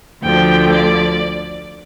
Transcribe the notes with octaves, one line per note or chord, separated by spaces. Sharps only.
D2 D3 F3 G5
D5